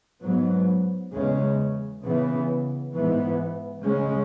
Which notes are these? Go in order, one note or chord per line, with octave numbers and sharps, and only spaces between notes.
G#2 F#3 B3
E2 C#3 G#3 C#4
C#3 E3 B3
G#2 E3 B3
C#3 G#3 C#4